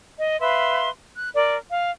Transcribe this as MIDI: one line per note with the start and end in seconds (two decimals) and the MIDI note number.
0.18 0.38 75
0.40 0.88 71
0.40 0.88 76
0.40 0.88 77
0.40 0.88 84
1.15 1.28 90
1.35 1.57 70
1.35 1.57 74
1.70 1.90 77